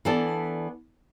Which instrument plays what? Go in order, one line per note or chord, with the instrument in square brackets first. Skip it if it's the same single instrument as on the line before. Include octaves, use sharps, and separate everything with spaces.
[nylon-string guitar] E3 B3 D4 A4 D5